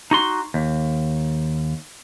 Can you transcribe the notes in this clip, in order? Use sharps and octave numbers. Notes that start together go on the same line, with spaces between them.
D#4 F#4 C6
D#2